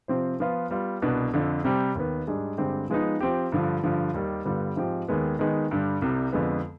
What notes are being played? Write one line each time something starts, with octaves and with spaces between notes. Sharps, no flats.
C3 F3 C4 G4 C5
F3 B3 F4 B4
G3 B3 F4
C2 B2 B3 D4
F2 D3 F3
C3 G3 C4 G4
D#2 D#3 B3
G#2 G3 D4 G#4
G2 D3 G#3 C4 G4
F3 G#3 B3 D#4
F3 C4 G4
G2 D3 F3
G2 D3 F3
D#2 D#3 G3
G2 D3 G3 B3 F4
G#2 F3 C4 G4
D#2 D#3 G#3 B3
D#3 G#3 B3 D#4
G2 D3 G3
C2 C3 G3
F2 D3 F3 G#3 B3